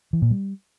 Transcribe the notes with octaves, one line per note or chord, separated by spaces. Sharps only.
E3
A#2
G3